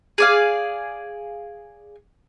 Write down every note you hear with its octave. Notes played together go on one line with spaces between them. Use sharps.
G#4 D5 F5